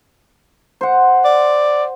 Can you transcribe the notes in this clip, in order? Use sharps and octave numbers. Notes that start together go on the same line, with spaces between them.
C5 F#5
D5